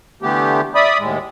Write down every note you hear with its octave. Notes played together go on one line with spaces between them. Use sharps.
D3 E3 A3 B3 G4
D5 E5 B5 D#6
D#2 A2 G#3